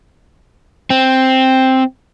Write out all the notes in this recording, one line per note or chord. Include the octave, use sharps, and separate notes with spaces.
C4